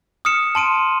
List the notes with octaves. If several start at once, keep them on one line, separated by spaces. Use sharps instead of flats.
D#6 F6 C#7 E7
A5 C6 D7 D#7